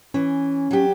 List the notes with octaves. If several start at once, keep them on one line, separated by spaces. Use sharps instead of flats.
E3 C#4
F#3 G4